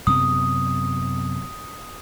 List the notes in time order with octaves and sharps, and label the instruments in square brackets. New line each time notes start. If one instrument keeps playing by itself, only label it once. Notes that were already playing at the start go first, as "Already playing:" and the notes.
[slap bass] F#2 C3 B3 [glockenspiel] D#6